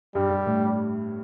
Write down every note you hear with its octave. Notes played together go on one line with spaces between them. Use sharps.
G2 G3
G2
A2